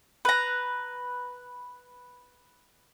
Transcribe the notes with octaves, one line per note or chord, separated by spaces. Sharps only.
B4 A#5